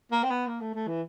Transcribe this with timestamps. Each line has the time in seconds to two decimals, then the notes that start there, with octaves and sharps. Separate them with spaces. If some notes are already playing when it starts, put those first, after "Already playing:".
0.12 A#3
0.24 C4
0.30 B3
0.47 A#3
0.61 A3
0.74 A3
0.88 E3